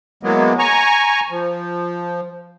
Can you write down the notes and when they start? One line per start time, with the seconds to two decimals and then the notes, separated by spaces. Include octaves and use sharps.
0.23 E3 F#3 G#3 A#3 B3
0.59 G#5 A#5 C#6
1.30 F3